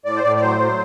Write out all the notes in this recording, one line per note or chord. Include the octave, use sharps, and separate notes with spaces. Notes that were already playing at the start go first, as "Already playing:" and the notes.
A2 D5
C5
A2 D5
D5
F#3 C5
F#3